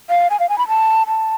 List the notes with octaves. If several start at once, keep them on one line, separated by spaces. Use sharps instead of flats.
F5
G#5
F5
G#5
B5
A5
A5